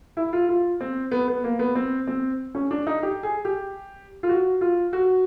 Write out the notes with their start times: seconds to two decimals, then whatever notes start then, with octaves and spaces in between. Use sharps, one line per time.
0.17 E4
0.33 F4
0.49 F4
0.81 C4
1.11 B3
1.28 B3
1.44 A#3
1.59 B3
1.75 C4
2.07 C4
2.55 C#4
2.71 D4
2.87 D#4
3.03 G4
3.23 G#4
3.45 G4
4.23 F4
4.29 F#4
4.61 F4
4.93 F#4